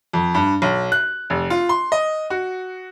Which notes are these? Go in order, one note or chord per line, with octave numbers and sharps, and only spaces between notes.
F2
G2
B1
F#6
F1
F4
C6
D#5
F#4